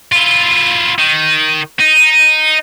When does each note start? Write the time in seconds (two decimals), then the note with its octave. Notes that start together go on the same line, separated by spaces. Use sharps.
0.12 E4 F4
0.99 D#3
1.80 D#4